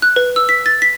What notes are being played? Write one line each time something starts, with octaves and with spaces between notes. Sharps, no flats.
F#6
B4
E6
B6
A6
B6